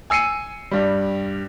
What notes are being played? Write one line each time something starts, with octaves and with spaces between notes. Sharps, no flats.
G#5 E6 C7 C#7 D#7
G2 G3